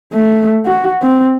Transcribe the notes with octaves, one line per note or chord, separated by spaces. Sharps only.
A3
F#4
C4